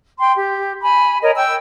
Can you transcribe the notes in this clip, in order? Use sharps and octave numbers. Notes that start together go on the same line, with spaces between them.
G5 C6
G4
G#5 B5
A#4 C#5 D#5
G5 C#6 E6